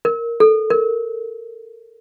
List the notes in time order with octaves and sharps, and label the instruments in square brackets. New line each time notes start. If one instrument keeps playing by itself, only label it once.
[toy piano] A#4
A4
A#4